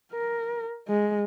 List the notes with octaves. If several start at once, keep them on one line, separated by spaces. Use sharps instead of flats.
A#4
G#3